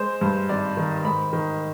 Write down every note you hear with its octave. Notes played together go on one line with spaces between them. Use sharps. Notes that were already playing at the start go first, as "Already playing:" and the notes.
Already playing: G#3 C5
G2
G#1 D5
D#3
G#2 B5
D#3